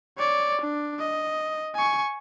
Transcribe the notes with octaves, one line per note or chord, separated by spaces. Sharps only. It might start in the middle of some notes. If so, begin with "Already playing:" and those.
C#5 D5
D4
D#5
G#5 C#6